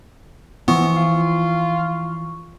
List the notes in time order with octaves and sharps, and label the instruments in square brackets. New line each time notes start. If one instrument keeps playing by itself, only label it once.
[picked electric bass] E3 F3 [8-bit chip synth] B3 [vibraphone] C#6
[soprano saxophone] F4